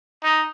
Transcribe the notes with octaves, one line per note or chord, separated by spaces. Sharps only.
D#4